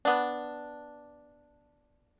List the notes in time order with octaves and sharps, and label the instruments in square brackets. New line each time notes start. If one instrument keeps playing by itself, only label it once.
[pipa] B3 D4